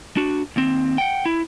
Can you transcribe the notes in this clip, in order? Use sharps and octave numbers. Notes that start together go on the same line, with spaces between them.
D4 F#4
D#2 C4
F#5 G5
E4